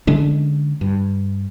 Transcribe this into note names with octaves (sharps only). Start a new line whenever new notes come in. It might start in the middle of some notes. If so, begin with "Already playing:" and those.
D3 G#3 C#4 D4
G2